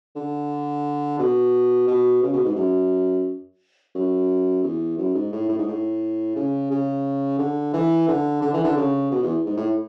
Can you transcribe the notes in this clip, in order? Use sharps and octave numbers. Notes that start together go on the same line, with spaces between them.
D3
B2
B2
C#3
B2
G#2
F#2
F#2
E2
F#2
G#2
A2
A2
G#2
A2
C#3
C#3
D3
E3
D3
D3
E3
D3
C#3
B2
E2
G#2
A2